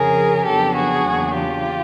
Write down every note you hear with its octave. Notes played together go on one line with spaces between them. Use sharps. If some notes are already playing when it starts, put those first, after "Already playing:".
Already playing: F2 C#3 F3 G#4 A#4
F2 C#3 F#3 B3 D4 G4 A4
F#4 G#4
E2 C#3 F#3 A#3 D4
F4 G4